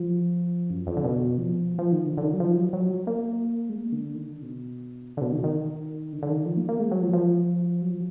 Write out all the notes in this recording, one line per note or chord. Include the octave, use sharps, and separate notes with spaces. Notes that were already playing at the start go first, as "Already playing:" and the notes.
Already playing: F3
F#2
F2
D3
B2
F3
F3
D#3
D3
D3
D#3
F#3
F3
F#3
F#3
A#3
G#3
A#3
D3
D#3
D3
B2
D3
B2
D#3
D#3
D3
D3
D#3
F3
A#3
A#3
G#3
F#3
F3
F3
F#3
F3